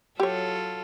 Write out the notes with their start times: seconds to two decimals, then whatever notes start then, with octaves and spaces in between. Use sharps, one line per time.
0.20 F#3 F4 G4 A4 C#5